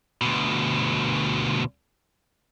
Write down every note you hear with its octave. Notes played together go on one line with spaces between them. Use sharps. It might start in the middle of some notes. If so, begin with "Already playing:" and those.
D2 B2